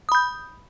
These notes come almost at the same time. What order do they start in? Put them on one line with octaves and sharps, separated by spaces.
D#6 B5 G6